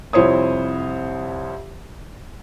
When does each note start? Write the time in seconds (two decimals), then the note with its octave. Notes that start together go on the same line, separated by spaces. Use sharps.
0.13 C2 F2 E4 C5 C#5 D#6